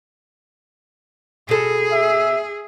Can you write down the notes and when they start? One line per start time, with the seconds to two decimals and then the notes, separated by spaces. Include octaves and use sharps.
1.49 B2 G#4 A4
1.92 E5